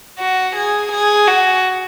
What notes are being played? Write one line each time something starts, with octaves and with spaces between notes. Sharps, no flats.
F#4
G#4
G#4
F#4